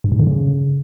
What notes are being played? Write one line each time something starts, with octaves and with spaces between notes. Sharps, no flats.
G2
G#2
D3
C#3